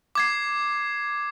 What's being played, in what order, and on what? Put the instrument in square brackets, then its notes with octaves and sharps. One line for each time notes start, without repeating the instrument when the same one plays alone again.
[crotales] D6 G#6 C7